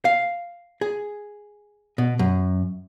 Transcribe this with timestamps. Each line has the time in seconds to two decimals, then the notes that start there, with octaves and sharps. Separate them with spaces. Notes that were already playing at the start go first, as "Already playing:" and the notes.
0.05 F5
0.81 G#4
1.98 B2
2.19 F#2